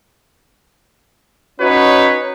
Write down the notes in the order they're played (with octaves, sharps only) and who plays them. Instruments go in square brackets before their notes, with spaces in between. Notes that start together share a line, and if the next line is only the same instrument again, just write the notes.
[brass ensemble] C#4 D#4 F#4 B4 C#5